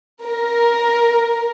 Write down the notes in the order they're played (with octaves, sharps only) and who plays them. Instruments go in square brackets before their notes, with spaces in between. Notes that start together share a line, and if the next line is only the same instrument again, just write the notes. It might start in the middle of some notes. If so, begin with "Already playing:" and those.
[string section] A#4